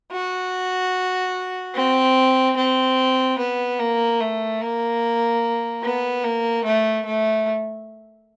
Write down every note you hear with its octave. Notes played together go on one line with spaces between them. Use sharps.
F#4
C4
C4
B3
A#3
A3
A#3
B3
A#3
A3
A3